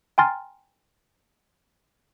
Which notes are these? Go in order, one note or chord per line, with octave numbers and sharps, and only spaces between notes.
G5 G#5 A#5 C6 F6 A6